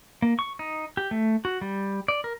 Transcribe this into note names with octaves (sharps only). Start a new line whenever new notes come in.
A#3
C#6
D#4
G4
A3
F#4
G3
D5
A#4